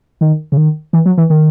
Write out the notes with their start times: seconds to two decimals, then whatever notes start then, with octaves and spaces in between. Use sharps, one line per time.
0.21 D#3
0.52 C#3
0.57 D#3
0.93 E3
1.06 F#3
1.18 E3
1.30 D#3